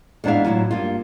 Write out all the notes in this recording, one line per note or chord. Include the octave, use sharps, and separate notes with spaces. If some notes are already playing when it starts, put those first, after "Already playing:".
E2 G#2 D4 E4 D5 F5
A2 F#3 E4 F4
G2 A#3 F4